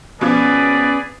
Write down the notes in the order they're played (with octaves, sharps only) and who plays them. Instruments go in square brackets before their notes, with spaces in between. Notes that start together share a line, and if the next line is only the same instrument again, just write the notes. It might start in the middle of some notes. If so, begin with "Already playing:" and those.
[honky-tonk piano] B2 F3 [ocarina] C#4 [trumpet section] G#4 B4 D5